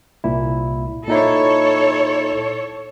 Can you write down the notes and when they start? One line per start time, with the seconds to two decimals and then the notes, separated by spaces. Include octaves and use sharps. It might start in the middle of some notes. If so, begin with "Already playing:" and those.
0.24 C2 A#2 E4
1.08 A#2 D#4 E4 A4 C#5